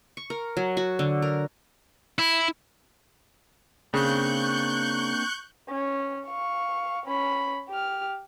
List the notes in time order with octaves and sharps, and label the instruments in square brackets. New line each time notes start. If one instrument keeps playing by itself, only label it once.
[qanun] C#6
A#4
F#3
F#4
D3
A#4
[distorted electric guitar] E4
[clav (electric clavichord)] C#3 [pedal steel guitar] A#3 C4 D4 [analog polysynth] C#6 F#6 G6
[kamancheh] C#4
F5 C#6
C#4 B5
G4 F6